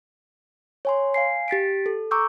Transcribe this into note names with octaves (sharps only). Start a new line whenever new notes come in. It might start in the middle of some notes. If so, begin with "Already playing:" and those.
C#5 G#5 C6
F5 G#5 C7
G4 A6 B6 D7
A4
A#5 C#6 D6 E6 G6